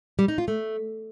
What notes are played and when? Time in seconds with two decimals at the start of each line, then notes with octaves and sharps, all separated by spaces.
0.19 G3
0.28 D#4
0.38 F4
0.48 A3